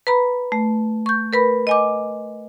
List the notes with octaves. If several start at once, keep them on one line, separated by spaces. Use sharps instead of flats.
B4 A#5 B5
A3
C#6 G6
A#4 B4 B5
D#5 G#5 D6